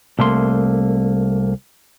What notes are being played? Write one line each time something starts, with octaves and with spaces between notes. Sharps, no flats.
C2 A3 A#3 C6